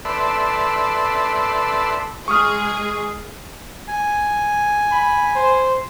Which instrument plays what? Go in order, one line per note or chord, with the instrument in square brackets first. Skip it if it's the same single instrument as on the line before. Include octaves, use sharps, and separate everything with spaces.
[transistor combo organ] A4 B4 D5 E5 C6
[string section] G#3 G#4 [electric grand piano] C#6 D#6 F6
[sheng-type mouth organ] G#5
[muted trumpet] B5
C5